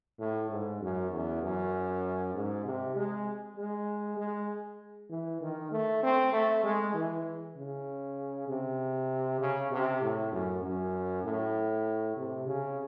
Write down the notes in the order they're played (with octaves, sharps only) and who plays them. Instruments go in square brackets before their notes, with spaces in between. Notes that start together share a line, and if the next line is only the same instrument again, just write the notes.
[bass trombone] A2
G#2
F#2
E2
F#2
G#2
C3
G#3
G#3
G#3
E3
D#3
A3
C4
A3
G#3
E3
C#3
C3
C#3
C3
A2
F#2
F#2
A2
C3
C#3